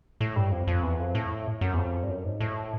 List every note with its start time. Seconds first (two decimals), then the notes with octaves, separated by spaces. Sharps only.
0.21 A2
0.36 G2
0.52 F2
0.67 F2
0.83 E2
0.99 F2
1.15 A2
1.61 F#2
1.74 E2
1.78 F2
2.03 G2
2.09 F#2
2.24 G#2
2.41 A2